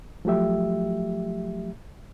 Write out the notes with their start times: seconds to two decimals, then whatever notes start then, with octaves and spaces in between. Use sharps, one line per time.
0.25 F3 F#3 A3 G4 E5